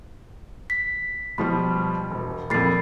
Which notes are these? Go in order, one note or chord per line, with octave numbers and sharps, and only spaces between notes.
B6
B2 F3 G3 B5
E1
F2 A#2 B5 A6 C7